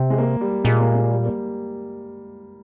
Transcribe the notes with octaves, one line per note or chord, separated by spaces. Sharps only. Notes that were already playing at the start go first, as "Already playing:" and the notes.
Already playing: C3
G#3
A#3
G3
A#2 G#3
A#3
G#3
G3
A#3